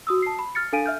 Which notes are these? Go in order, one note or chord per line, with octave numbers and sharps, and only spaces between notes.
F#4 D#6 E6
A5 C7
B5
F6 A6 C#7
D4 A4 F5 G#5 D7 D#7
E5 F6 G6